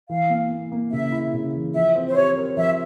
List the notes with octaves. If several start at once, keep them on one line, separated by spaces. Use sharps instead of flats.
E3 F5
A#3
A#3
A#3
C#3 E5
E4
C#3
E3
F3 E5
C4
C5
G4 C#5
A#4
F3 E5